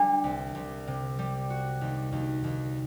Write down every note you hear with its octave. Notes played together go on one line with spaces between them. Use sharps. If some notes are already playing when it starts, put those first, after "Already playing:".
Already playing: G3 D4
C2
C2
C3
G3
F#4
D#2
D#2
D#2